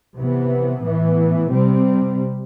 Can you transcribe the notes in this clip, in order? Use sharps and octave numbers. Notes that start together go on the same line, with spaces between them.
C3 E3 B3
A2 E3 B3
C3 G3 C4